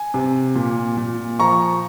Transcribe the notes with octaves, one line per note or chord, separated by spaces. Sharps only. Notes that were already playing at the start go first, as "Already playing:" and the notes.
Already playing: G#5
C3
A#2
A#2
F3 A#5 C#6